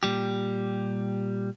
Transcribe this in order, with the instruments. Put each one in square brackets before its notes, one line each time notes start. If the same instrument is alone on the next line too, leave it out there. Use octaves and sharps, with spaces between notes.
[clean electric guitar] A#2 G3 G4